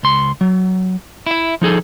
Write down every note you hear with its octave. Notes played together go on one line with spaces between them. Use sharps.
C#2 C6
F#3
E4 E5
F3 D#4 G#4 A4